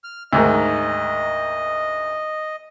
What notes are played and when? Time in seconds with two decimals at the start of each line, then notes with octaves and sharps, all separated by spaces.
0.04 F6
0.33 D2 G#2 D#3 D#5